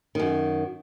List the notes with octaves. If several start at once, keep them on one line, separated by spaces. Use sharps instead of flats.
F#2 D#3